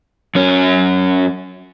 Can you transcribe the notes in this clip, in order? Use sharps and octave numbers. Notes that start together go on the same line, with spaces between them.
F#2 C#4